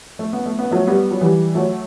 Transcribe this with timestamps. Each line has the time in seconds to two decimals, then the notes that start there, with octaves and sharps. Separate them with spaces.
0.19 A3
0.33 B3
0.46 A3
0.59 B3
0.71 F#3 A3
0.87 G3 B3
1.11 F#3
1.21 E3 G3
1.55 F#3 A3